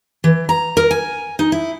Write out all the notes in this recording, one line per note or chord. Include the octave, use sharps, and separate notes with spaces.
E3
A#5
A#4
G#5
D#4
E4